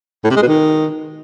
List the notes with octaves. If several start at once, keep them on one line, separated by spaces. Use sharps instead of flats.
A2
C3
G#3
B2
D#3